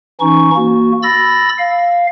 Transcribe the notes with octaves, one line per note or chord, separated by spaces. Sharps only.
E3 C#4 D#4 C#6
A#3 F#4
B5 E6 A6 A#6
F5